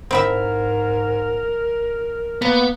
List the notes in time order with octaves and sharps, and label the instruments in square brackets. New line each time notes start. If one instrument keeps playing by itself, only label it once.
[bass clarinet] G#2 [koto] C4 E4 E5 [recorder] A#4
[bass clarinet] A#3 [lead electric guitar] B3 [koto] A#5